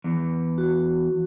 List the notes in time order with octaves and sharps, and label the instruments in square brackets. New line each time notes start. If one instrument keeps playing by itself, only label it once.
[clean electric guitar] E2
[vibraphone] F#4